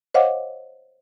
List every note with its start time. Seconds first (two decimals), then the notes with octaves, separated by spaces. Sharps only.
0.14 C5 C#5 D#5 F5 F#5 D6